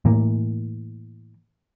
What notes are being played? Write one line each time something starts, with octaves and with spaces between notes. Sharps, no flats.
A2 E3 A#3